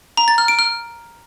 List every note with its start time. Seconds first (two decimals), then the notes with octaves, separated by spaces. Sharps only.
0.17 A#5
0.28 A6
0.38 F6
0.48 D7
0.59 F6